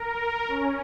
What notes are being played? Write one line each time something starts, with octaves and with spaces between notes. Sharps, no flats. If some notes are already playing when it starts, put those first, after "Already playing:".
Already playing: A#4
C#4